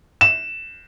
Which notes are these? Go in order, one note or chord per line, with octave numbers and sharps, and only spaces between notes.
E7